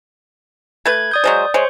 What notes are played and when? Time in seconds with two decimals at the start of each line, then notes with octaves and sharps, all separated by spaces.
0.86 A3 B4 G#6
1.11 D5 D#6 G6
1.24 F#3 G#3 C5
1.54 G#3 C5 C#5 C#6